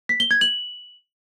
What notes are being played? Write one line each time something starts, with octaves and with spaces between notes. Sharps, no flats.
B6
G7
G#6
F#7